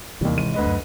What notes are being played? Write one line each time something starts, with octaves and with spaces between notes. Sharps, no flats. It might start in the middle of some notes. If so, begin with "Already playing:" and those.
D#2 C3 E3 G3
G#1 D#7
D2 B4 D#5
F#2